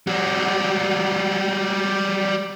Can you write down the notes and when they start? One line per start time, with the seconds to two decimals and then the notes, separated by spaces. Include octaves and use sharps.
0.07 G3 F#4